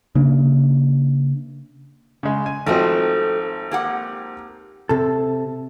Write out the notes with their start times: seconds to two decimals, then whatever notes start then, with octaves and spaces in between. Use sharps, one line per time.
0.15 C#3 A#3 D4
2.23 C#3 G#3
2.46 G#5
2.66 G#1 F3 A3 C4 F#4 D#5
3.72 A#3 G4 F#5
4.89 C3 A4